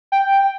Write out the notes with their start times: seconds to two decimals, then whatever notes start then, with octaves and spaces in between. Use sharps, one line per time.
0.12 G5